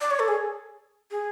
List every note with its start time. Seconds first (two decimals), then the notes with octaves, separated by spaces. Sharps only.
0.01 D5
0.11 C#5
0.19 A4
0.28 G#4
1.11 G#4